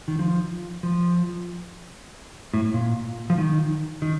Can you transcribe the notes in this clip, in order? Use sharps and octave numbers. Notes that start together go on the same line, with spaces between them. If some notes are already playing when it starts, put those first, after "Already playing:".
D#3
F3
F3
A2
A#2
F3
D#3
D#3